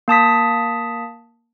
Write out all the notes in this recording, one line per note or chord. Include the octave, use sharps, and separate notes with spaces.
A#3 A5 D#6 B6